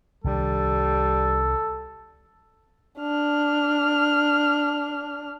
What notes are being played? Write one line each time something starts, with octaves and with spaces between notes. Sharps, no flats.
C2 D#3 G3 D4 A4
D4 F6